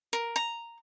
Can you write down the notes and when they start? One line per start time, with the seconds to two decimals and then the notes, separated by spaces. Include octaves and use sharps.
0.13 A#4
0.36 A#5